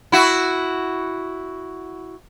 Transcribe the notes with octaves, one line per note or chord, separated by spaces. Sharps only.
E4 F#4